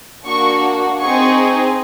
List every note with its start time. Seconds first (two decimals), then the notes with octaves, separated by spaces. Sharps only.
0.25 A#3 D4 F#4 C#6
1.00 C4 D#4 G#4 C#6